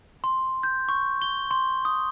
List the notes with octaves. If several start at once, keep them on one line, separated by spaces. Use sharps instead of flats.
C6
G6
C#6
G7
C6
D#6